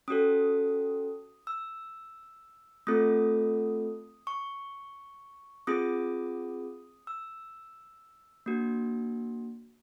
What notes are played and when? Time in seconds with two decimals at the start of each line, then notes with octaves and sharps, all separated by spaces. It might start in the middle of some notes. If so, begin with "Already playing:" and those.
0.08 C#4 F#4 A4 D#6
1.47 E6
2.87 A3 C4 F4 A4 D#6
4.27 C#6
5.67 C4 F4 G#4 D#6
7.07 E6
8.46 A#3 D4 F#4